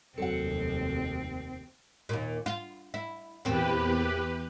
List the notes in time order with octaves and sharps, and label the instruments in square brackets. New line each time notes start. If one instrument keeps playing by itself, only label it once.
[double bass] F1 D#2 [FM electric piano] F#3 C#7 [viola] C4 [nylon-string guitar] A4 F#5
[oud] D#2 A#2
F4
E4
[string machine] E2 G4 B4 [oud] A#2 C4